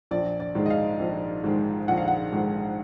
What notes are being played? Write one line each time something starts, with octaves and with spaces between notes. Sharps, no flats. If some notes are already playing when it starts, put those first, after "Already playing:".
A#1 D5
D5
G#2 D#3 G#3
D#5
F5
A#1
G#2 D#3 G#3
A#1 F#5
F5
F#5
G#2 D#3 G#3